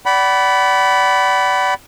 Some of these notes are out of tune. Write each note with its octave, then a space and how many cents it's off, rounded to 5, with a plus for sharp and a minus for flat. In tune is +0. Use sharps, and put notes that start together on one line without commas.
D5 -20 F#5 +40 B5 +0